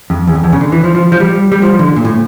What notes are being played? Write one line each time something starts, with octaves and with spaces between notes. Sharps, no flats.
F2
E2
F2
E2
C#3
D3
E3
F3
F3
F3
G3
G3
F3
D3
A#2
A2